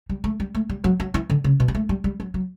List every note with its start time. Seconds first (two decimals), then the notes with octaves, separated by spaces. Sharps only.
0.09 G3
0.24 A3
0.40 G3
0.55 A3
0.69 G3
0.84 F#3
1.00 F#3
1.14 E3
1.30 D3
1.44 C#3
1.60 B2
1.68 G3
1.75 A3
1.89 G3
2.04 G3
2.20 F#3
2.34 F#3